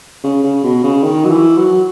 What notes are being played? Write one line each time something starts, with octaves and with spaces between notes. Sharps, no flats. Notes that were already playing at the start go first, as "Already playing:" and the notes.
C#3
C#3
B2
C#3
D#3
F#3
E3
F#3